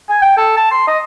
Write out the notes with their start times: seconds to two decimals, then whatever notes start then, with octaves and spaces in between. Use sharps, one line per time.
0.09 G#5
0.22 G5
0.38 A4
0.57 A5
0.72 C6
0.88 D#5